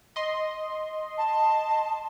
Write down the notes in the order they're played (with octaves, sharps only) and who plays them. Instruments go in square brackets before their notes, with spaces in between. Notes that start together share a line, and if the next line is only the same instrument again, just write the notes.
[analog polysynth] D#5 C6
[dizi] A5